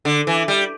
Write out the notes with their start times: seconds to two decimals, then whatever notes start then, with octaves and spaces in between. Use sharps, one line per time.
0.05 D3
0.27 E3
0.48 G3